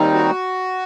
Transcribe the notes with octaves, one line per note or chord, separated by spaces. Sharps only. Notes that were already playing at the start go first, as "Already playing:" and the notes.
Already playing: D#2 D#3 G3 C4 D#4
F#4